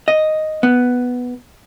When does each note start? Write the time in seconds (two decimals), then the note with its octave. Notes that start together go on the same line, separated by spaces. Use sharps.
0.08 D#5
0.63 B3